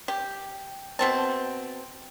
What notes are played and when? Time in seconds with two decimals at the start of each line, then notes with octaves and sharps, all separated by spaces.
0.08 G4
0.99 B2 C4 A5